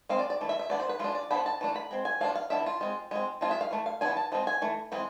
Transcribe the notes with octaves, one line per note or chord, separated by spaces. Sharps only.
G#3 C4 F5
D5
D5
E3 A3
E5
E5
E3 B3 D4 D5
C5
B4
G#3 D4 F4
D5
F3 B3 D4 B5
A5
E3 A3 D4
B5
G#3 C4
G#5
F3 B3 D4 F5
F5
E3 B3 D4 E5
F4
G#3 C4
G#3 C4
F3 G#3 C4 F4
E5
F5
E3 A3
F5
E3 B3 D4 G#5
A5
F3 G#3 C4
G#5
E3 A3
E3 G#3 C4